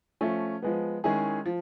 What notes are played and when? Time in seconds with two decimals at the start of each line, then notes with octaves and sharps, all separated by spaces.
0.21 F3 A3 C#4
0.62 F3 G#3 B3
1.04 D#3 G#3 C#4 E4 G#4
1.46 F3